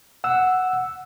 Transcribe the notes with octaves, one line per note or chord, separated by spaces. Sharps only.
F#5 E6